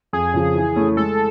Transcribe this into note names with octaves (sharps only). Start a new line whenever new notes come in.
F2 G#4
C#3 F3
E3
A3 C#4 E4
G#3 A4